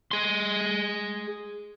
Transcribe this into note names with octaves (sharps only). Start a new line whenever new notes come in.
G#4 C6